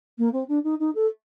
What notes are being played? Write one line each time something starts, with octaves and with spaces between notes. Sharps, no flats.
A#3
C4
D4
D#4
D#4
A4